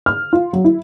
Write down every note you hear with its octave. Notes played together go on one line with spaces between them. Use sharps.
F6
F4
F#3
E4